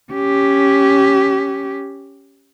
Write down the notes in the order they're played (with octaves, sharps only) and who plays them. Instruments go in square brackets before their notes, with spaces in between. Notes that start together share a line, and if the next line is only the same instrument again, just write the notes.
[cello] C#4 G4